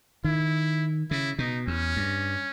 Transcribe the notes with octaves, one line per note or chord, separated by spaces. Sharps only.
D#3 E4
C#3 E4
B2 D#4
E2 C#4
G2